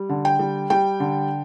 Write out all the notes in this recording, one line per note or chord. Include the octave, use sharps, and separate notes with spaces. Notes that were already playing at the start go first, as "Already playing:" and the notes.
Already playing: G3
D3
G5
G3
G3 G5
D3